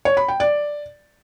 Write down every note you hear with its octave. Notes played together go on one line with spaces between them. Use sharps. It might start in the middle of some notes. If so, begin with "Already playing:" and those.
C#5
B5
G5
D5